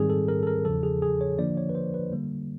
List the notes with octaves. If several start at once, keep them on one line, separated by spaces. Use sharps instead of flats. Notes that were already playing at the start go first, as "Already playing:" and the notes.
Already playing: G#2 D#3 G3 C4 G#4
A4
A#4
A4
A#4
E2 C#3 F3 A4
G#4
G#4
C#5
D3 F3 A#3 D4 D5
C#5
B4
C5
B4
D3 G3 A#3